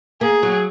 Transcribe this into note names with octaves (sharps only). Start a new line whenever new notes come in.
A#3 G#4
F#3